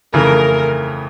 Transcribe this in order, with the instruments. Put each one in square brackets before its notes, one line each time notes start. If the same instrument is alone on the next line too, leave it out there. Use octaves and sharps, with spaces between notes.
[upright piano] F2 C#3 E3 A3 [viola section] A#4